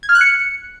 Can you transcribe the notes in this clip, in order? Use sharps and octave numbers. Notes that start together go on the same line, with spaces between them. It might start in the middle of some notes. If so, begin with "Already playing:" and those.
G#6
F6
F#6
C#7